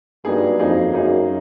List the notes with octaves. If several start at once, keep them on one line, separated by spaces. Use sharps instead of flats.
G2 F#3 A#3 D#4 G#4
F2 F#3 A#3 D#4 G#4
F#2 F#3 A#3 D#4 G#4